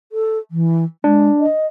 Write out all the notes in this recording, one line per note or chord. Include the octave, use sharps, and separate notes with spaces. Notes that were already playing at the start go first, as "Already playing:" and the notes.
A4
E3
G#3 D4
D#5